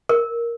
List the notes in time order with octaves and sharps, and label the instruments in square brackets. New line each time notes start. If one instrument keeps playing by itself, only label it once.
[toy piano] A#4